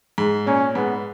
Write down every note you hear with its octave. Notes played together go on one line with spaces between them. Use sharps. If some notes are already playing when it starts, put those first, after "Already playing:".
G#2
A#2 C#4
G#2 B3